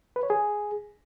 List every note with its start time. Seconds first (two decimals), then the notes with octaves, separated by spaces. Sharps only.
0.16 B4
0.23 C#5
0.30 G#4